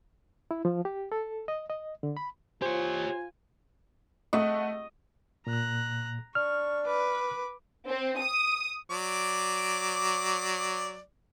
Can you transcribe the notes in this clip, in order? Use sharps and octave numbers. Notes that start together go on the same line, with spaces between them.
E4
F3
G4
A4
D#5
D#5
D3
B5
F4 G4 C5 C#5 G#5
A3 D#5 F#5
A#2 A#5 F#6
D4 C#6 F6
B4 D6
C4
D#6
F#3 D5 D6